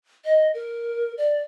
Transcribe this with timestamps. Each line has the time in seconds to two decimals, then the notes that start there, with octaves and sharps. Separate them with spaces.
0.25 D#5
0.54 A#4
1.18 D5